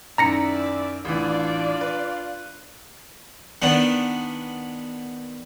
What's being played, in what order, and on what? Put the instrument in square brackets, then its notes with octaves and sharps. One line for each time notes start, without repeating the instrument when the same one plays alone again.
[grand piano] F#2 D#3 [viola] E4 E5 [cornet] D5 [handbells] A#5 A#6 C#7
[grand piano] A1 E3 [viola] D4 D5 [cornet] F4
[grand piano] B4
[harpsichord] D#3 B3 D4